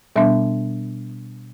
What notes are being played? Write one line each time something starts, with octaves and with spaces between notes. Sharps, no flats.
B2 G3 B3 D4 E5